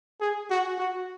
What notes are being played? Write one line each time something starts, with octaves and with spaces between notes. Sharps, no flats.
G#4
F#4
F#4